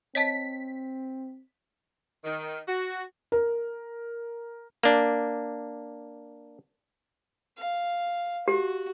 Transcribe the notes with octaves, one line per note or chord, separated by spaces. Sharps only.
C4 C#5 D#5 A5 B6
D#3
F#4
A#4
A#3 D4
F5
F#4 G4